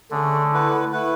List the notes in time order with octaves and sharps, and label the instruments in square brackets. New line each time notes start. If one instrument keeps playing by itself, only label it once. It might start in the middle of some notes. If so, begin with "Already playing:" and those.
[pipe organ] D3 [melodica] A3 C#4 G#4
[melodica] A3 E4 B4 F#5
A3 E4 B4 F#5